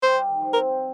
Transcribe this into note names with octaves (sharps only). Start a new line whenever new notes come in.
G3 C5
G3
D#3
F3
C4 A#4